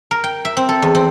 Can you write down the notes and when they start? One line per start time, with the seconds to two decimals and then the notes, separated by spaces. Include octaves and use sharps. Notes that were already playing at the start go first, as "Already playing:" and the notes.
0.11 A#4
0.24 G5
0.45 E5
0.57 C4
0.69 A4
0.82 E2
0.95 C4